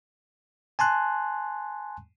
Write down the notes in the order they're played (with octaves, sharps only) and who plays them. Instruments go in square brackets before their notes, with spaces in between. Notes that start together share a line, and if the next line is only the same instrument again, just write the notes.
[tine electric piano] G#5 A5 C6 F#6